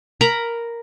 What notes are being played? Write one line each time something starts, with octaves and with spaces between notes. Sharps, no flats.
A#4 A#5 B5